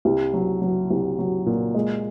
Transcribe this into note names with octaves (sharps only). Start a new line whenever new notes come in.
C2
F#3
F#3
C2
F#3
A#2
G#3